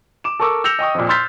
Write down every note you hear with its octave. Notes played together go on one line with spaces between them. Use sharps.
D6 E7
A4 A#4 C#6 D6 E6
E6 G6 A#6 C#7 E7 F7
D#5 G5 C#6 D#6
F2 A#2
C6 E6 F6 G6 A6 B6